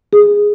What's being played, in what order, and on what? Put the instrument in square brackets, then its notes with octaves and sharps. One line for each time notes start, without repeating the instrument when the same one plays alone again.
[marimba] G#4